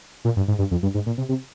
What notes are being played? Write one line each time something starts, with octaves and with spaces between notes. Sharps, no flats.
A#2
G2
G#2
G2
F2
G2
G#2
A#2
C3
C3